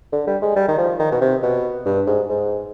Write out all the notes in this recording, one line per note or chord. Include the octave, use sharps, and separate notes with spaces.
D3
G3
G#3
G3
D#3
F3
D#3
B2
C3
B2
G2
G#2
G#2